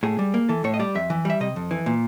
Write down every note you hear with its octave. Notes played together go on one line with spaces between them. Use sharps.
A2 G#4
G3
A#3
E3 A4
A2 C#5
D#5
G3 D5
F2 E5
E3
G3 E5
C3 D#5
F2
E3
A#2